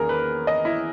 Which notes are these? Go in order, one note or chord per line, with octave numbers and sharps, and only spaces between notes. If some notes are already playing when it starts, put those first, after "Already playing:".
Already playing: E2 D#3 A#3 C#4 G#4 A#4
B4
D#5
E4